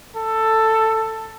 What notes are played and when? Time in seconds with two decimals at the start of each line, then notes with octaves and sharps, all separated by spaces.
0.16 A4